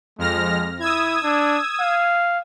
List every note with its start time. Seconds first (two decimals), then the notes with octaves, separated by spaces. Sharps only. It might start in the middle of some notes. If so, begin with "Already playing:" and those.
0.18 F2 G#3 F6 A#6
0.80 E4 D#6 E6 G#6
1.23 D4
1.80 F5